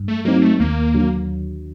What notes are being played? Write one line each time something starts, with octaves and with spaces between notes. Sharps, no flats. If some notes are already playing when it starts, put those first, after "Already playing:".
Already playing: G2
A3
F#3 A3 A#3 C4 D#4
A3
D#2 A#3
D3 F#3